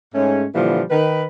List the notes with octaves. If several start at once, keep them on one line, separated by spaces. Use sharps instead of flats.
G#2 G#3 A3 C#4
A#2 D3 E3 F3 G3 A#3
D#3 B4